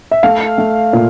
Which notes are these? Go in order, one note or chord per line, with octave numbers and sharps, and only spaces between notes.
E5
A3 F5
A3
A#2